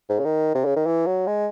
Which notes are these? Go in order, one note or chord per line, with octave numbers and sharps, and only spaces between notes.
G#2
C#3
D#3
C3
C#3
D#3
E3
F#3
G#3